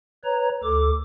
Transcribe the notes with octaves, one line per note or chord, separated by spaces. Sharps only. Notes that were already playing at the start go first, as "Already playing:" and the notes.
B4 C#5 A#5
D2 A4 D6